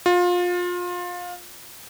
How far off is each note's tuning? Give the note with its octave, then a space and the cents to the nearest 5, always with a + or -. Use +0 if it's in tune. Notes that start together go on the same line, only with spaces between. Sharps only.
F4 +25